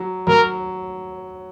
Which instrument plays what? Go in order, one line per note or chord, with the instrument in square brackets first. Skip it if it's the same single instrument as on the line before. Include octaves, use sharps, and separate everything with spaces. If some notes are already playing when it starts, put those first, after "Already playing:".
Already playing: [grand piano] F#3
[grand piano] F#3 [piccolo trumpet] A#4